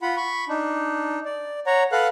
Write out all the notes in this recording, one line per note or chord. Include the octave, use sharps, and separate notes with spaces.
F4 F#5 B5
B5 C#6
D4 D#4
D5
C#5 F#5 A#5
A4 B4 F5 F#5 F#6